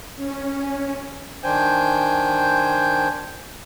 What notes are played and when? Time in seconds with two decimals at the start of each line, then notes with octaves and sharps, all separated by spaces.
0.16 C#4
1.44 D#3 D4 C5 G5 G#5 G6